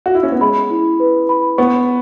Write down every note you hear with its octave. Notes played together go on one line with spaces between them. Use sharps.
F#4
E4
C#4
B3
G#3 B5
E4
B4
B5
B3 C#6